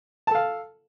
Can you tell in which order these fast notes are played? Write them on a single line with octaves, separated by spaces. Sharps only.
A5 A4 F5